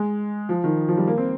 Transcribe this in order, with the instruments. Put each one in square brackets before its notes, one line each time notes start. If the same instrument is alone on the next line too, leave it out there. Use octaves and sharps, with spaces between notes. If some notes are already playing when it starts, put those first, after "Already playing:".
Already playing: [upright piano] G#3
F3
D#3
F3
G3
A#3
C4